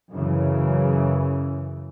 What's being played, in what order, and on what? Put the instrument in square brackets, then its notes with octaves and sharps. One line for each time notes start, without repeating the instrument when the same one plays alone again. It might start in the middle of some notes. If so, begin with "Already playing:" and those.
[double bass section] F#2 C#3 E3